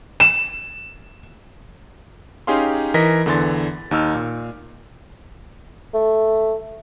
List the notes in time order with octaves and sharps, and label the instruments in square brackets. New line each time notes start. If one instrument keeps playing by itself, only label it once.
[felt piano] E7
[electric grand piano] C#4 D#4 G4 G#4 F5 C6
E3 A#4 D#5 A#6 B6
E2 D3 E3 C6 A6
D#2 D#4 E6 F6
A#2
[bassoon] A3